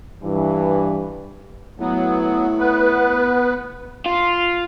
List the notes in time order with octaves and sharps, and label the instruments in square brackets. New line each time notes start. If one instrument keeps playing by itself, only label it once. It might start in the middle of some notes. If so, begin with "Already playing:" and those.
[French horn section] G2 E3
[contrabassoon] A2 [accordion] F#3 B3
[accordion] B3 B4
[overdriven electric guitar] F4